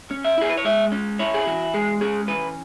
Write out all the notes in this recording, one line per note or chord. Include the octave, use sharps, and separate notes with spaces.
C#4
E5
E4 G#4
B4
C#5
G#3 E5
C#4
E4 C#5
G#4
E3 F#4
G#3 G#4
C#4 G#4
E3 B4